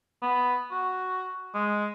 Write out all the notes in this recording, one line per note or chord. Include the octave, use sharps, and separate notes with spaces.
B3
F#4
G#3